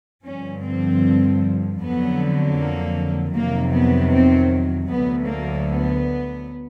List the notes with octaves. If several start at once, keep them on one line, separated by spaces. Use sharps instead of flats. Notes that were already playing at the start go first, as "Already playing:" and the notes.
G2 D3 F3 C#4
C4
F2 D3 F#3 B3
A#3
F2 C3 D#3 F#3 A#3
B3
C4
D2 D3 F#3 B3
A#3
B3